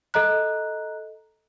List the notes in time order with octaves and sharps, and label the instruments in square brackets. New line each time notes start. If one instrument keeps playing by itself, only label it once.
[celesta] A4 D#5 A#5 F#6